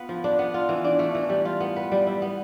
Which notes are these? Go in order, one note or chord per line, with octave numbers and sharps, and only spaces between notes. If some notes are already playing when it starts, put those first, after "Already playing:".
Already playing: B3 F4 B4
F3
D4
B3
F4
E3
D4
A3
E3
G3
F4
B3
B4
G3
E4
B3